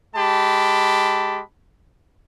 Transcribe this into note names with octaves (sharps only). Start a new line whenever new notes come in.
G#3 G4 A5 B5